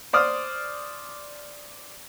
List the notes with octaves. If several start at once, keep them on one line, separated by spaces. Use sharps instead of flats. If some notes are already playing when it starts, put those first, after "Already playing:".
C5 D5 D#6 F6